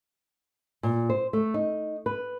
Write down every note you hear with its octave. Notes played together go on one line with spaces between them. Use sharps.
A#2
C5
A3
D#4
B4